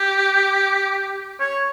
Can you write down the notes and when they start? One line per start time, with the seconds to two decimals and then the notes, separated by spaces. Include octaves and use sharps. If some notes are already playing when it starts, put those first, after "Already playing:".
Already playing: G4
1.40 C#5